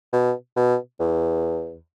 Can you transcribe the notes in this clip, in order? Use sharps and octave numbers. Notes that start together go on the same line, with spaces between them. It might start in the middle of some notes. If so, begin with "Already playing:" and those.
B2
B2
E2